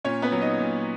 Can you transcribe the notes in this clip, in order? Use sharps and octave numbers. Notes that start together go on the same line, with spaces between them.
A#2 C#4 C#5
B3 B4
F#3
D#4 D#5
A#2